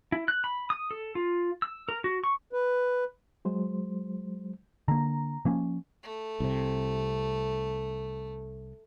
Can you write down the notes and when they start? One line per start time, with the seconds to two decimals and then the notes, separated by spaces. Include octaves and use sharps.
0.12 E4
0.28 F#6
0.44 B5
0.70 D#6
0.91 A4
1.15 F4
1.62 E6
1.89 A#4
2.04 F#4
2.24 C#6
2.52 B4
3.45 F#3 G#3 C5
4.88 D3 A#3 A#5
5.45 F3 A#3 C#4
6.03 A3
6.40 C2 C3